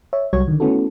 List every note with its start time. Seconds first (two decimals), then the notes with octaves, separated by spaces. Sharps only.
0.13 C#5 E5
0.33 C2 F#3 G3 F#4 C#5 G#6
0.48 D3 D#3
0.60 A3 B3 C#4 E4 F#4 A4